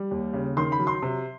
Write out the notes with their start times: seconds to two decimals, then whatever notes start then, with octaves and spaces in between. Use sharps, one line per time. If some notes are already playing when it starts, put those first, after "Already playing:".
Already playing: G3
0.11 D#2
0.33 C#3
0.57 D#3 C6
0.72 B5
0.80 F#3
0.87 C6
1.02 C3